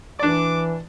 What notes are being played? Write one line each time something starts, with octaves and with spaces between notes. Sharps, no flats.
E3 D4 D5 D6